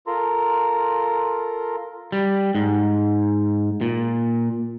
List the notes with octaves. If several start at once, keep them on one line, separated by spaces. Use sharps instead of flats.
F4 A4 A#4 A#5 C6
G3
G#2
A#2